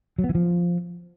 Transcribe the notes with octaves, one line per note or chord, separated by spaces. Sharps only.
F#3
B3
E3
F3